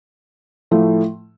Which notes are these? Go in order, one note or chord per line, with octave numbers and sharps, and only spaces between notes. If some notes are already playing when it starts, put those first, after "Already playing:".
A2 F3 A3